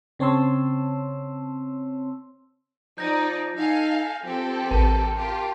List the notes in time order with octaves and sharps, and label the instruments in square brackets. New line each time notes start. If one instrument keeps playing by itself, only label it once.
[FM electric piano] C#3 C4 C#5 A5 C6 E6
[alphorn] F3 [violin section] D#4 D5 [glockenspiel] G6 A#6
[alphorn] D#4 [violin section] A4 F5 G#5
[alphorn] F3 [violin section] C4 G4 A4
[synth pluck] A1 [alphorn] A#4 [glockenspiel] A5
[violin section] F4 G4